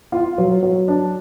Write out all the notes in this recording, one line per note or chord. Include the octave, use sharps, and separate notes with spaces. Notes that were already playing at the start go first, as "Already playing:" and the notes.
F4
F#3
F#3
D4